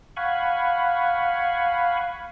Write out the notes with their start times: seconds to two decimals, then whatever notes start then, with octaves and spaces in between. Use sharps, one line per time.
0.16 F5 F#5 G#5 B5 C#6